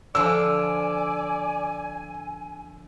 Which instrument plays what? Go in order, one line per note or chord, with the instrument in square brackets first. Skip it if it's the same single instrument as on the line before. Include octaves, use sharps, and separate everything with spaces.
[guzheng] D3 F3 [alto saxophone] D5 [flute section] G#5 [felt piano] E6